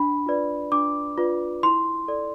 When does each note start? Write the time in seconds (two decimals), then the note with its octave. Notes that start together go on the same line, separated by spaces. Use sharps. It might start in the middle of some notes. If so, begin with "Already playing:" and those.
Already playing: D4 B5
0.26 F4 B4 D5
0.72 D4 D6
1.18 F4 B4 D5
1.63 E4 C6
2.08 A4 D5